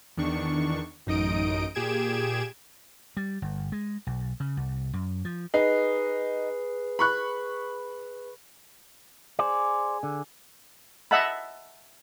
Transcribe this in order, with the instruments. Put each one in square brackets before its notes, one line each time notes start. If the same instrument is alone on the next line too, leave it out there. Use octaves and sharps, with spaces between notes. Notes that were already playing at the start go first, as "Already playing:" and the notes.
[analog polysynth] E2 D#3 D4 C#6
A1 F#2 D#4 D#5 D#6 D7
A#2 G4 G#4 G#6 D7 E7
[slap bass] G3
G1
G#3
B1
C#3
C2
F#2
F3
[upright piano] D#4 [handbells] G#4 B4 C7
[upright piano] B5 C#6 F#6
[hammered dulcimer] G#4 [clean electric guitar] C5 D5
[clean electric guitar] D3
[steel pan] D#5 E5 F#5 A5 B5